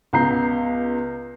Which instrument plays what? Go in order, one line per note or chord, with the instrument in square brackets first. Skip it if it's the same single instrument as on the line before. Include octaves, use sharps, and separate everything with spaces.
[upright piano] C#2 B3 A#5 G6 C7